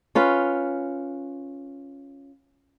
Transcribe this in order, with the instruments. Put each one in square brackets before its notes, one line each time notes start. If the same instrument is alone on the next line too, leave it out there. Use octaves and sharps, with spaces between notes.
[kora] C#4 F4 B4